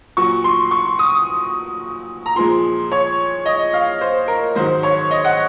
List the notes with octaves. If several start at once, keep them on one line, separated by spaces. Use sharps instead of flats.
A#2 F#3 C#6
C6
C#6
D#6
A#5
A#2 F3 G#3 C6
C#5
D#5
F5
C5
A#4
G#2 D#3 F#3 C5
C#5
D#5
F#5